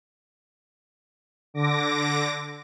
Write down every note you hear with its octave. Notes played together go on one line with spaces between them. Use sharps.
D3 D6 A#6